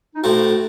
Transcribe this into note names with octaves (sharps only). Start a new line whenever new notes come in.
D#4
A2 A3 C4 F#4